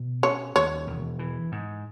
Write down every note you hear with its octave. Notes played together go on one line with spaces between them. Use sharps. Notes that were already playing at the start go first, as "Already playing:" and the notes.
Already playing: B2
C#4 C#5
D#2 C#5
E1
E3
G#2